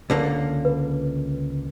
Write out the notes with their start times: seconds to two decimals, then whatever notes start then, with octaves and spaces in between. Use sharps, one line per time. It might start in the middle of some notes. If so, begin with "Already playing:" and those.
0.10 C#2 D3 A#3
0.65 B4